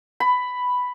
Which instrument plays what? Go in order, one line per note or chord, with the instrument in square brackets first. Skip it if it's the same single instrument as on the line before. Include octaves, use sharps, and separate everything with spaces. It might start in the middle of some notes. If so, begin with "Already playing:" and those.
[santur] B5